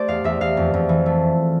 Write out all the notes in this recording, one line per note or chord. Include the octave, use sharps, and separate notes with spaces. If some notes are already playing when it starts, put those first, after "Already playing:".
Already playing: A3 C5 D5
E2 F5
E2 E5
E2 F5
F2
F2
E3
A3